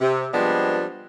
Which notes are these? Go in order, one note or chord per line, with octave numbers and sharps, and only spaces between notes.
C3
F3 G3 G#3 B3 C4 D4